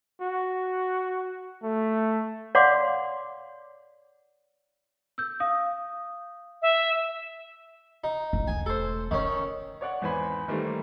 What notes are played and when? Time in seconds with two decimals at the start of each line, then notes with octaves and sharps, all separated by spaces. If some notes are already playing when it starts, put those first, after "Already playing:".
0.22 F#4
1.63 A3
2.55 C#5 D5 F5 F#5 C6 D6
5.18 E6 G6
5.40 F5 D#6
6.62 E5
8.04 D#4
8.33 F#1
8.47 E1 A3 G#5
8.66 A4 C5
9.11 D#3 B3 C#4 F4
9.81 C#5 D5 F#5 C#6
10.01 G#1 E2 E3 C5 G#5 B5
10.48 D#3 E3 G3 A3 A#3 C5